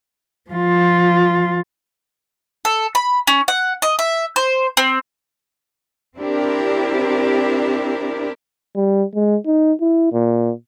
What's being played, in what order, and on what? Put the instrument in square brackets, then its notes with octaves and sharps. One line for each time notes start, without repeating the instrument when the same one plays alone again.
[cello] F3 F4
[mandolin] A4
B5
C#4
F#5
D#5
E5
C5
C4
[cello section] C4 D4 E4 G4 A#4
[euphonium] G3
G#3
D#4
E4
A#2